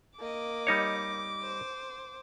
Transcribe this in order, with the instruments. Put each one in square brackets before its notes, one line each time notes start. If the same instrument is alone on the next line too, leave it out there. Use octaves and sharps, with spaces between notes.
[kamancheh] A#3 D#5 [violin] D6
[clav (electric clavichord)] G3 D#4 C#5
[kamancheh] C5